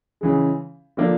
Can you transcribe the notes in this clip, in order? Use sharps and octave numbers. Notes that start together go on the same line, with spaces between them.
C#3 E3 G#3
D3 F3 A#3 D4